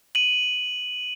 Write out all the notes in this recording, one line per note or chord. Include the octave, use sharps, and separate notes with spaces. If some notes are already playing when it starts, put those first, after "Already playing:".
D#7 F#7